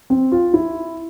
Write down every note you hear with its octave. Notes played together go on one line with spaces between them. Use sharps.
C4
F4
E4